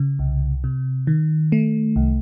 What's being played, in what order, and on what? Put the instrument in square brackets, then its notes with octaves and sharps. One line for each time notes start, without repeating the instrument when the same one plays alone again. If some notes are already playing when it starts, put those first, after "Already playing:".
Already playing: [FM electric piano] C#3
C2
C3
D#3
A3
C2